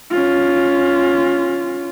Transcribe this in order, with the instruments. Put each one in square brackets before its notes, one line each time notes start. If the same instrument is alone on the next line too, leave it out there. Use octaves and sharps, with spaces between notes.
[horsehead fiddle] C#4 F4